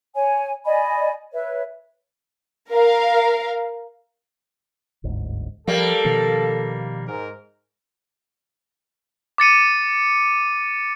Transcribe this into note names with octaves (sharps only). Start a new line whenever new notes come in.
C#5 G#5
D5 D#5 G#5 B5
B4 C#5 E5
A#4 F5
G1 D2 G#2
F3 G3 A#3 A4
B2 D#3 F3
G#2 A#4
D6 A6 C#7 D#7